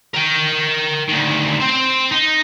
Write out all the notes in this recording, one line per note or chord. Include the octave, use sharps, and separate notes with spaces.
A#4 G5
D2 D#3
C4 C5
D#4